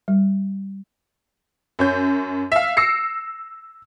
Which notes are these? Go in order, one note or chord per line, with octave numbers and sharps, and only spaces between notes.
G3
F#2 C#4 G6
E5 F5
E6 A#6 C7 C#7